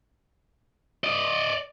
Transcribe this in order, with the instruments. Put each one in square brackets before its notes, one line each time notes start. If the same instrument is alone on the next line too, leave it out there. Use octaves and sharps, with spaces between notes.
[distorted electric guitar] D5 D#5